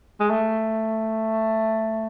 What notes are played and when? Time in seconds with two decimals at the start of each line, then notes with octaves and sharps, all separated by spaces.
0.20 G#3
0.30 A3